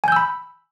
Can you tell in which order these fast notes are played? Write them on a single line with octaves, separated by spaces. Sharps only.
G#5 G6 E6 B5